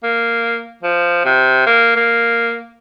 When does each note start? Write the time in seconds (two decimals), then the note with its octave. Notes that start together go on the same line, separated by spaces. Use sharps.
0.03 A#3
0.83 F3
1.25 C3
1.66 A#3
1.95 A#3